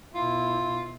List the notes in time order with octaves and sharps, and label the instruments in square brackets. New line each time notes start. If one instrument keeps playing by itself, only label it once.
[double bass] B2 E4 [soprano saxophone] F4